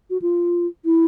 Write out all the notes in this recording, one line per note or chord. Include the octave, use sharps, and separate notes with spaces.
F#4
F4
E4